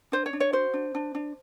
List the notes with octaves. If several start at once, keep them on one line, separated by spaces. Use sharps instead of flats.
D4 C5
C#5
D4
C#5
F#4 C5
D4
D4
D4